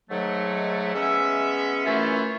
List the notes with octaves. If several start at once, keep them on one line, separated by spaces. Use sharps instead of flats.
G#2 D#3 F#3 A3
G#3 B3 C#4 E5
F#2 E3 A3 C#4 E4 F4